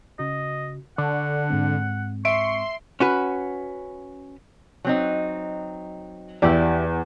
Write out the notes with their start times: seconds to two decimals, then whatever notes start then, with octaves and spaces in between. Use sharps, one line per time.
0.19 C#3 F#4 D#5
0.98 D3 F#5 C#6 D6
1.50 G#2 G#3 C4
2.25 E5 C6 C#6 D7
3.00 C#4 F#4 B4
4.85 F#3 C4 D#4
6.42 E2 E4 G4 D5